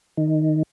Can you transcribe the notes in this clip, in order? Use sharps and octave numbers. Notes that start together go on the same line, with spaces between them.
D#3